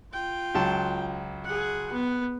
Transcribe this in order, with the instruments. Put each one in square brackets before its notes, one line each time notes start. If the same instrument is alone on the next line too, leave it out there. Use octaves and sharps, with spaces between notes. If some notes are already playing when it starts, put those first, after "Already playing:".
[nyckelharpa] F4 G5
[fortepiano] C#2 F#3 A5
[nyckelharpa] G#4 F#5
B3